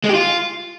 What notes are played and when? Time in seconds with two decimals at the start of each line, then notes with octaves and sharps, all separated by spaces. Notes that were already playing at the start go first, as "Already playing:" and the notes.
0.04 G#3
0.09 G4
0.14 F4